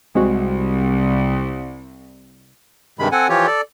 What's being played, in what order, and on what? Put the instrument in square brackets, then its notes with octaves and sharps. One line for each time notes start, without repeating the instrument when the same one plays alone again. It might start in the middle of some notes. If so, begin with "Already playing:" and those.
[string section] C2 [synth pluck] G#3 C4 F#4
[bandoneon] G2 C3 D#3 G#3 B5
C4 A4 F#5 G#5
E3 F3 F4 G4 C#5
A4 D5